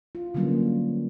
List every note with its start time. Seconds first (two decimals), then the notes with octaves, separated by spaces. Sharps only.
0.15 F4
0.35 D3 F#3 G3 A#3 B3 C#4